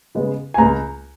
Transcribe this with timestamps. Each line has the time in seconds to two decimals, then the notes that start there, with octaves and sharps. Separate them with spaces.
0.15 C#3 G#3 B3
0.54 G#5
0.58 C#2 A#5